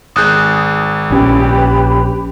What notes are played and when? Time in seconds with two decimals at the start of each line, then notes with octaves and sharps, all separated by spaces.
0.16 G#1 G#4 D#6 F#6 G6
1.11 A#1 C#4 G4 B4 B5